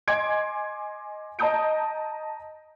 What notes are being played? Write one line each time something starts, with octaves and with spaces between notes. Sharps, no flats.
D#5 G#5 C6 D6 G#6 D7
D#5 A5 A#5 D#6 G6 D7